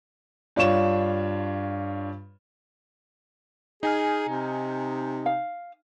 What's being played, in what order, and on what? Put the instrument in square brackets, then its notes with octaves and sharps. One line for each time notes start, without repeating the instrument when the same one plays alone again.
[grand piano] G2 D4 F4 C#5 E7
[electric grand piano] D#4 G#5 F6 [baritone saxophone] G#4
[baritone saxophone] C3
[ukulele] F5